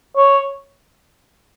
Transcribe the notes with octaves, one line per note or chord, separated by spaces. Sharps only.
C#5